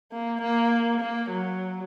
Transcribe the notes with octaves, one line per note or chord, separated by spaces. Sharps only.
A#3
A#3
A#3
F#3